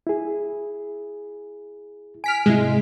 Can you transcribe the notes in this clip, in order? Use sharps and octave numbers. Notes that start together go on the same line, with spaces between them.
E4 G#4
G#5 F6 B6 D7
G#2 C3 G#3 E4